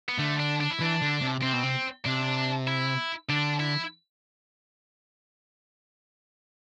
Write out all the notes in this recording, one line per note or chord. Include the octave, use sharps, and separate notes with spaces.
B3
D3 A3
D4
D4
E4
E3 D4
D3
C3
C3 C4
B2
C3
C3 D4
E4
D3 D4
E4